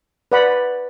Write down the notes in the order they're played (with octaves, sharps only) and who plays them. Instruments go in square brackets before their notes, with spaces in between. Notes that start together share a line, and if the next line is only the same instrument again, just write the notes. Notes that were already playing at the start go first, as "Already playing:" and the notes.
[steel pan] B4 D5 F#5 B5